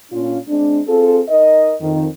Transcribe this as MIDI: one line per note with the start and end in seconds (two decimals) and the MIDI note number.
0.11 0.38 46
0.11 0.38 61
0.11 0.38 62
0.11 0.38 65
0.47 0.80 56
0.47 0.80 60
0.47 0.80 62
0.87 1.20 60
0.87 1.20 65
0.87 1.20 68
0.87 1.20 69
1.29 1.73 63
1.29 1.73 70
1.29 1.73 75
1.80 2.06 41
1.80 2.06 51